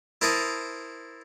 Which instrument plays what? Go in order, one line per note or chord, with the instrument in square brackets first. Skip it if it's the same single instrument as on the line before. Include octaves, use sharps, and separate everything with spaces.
[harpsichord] E4 A#4 C5 A5 A#5 D#6